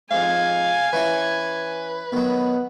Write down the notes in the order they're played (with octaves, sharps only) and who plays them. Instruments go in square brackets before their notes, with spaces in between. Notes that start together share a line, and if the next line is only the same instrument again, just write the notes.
[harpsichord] F2 G#2 [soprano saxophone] F5 [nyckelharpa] G#5
[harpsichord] E3 C#4 E4 [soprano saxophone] B4
[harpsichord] D#3 F#3 [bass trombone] B3